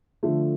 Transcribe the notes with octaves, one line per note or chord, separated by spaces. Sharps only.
D3 F3 A3